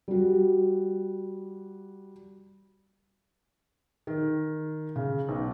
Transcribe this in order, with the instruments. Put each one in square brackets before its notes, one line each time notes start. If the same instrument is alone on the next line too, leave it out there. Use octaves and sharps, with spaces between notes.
[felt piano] G3 F#4
D#3
C#3
B1